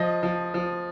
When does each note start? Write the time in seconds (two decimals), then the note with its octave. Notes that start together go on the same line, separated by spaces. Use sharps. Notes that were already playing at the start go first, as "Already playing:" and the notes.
Already playing: F3 D#5
0.23 F3
0.54 F3